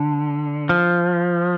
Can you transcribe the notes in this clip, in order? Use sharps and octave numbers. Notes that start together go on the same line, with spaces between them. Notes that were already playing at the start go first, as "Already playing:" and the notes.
Already playing: D3
F3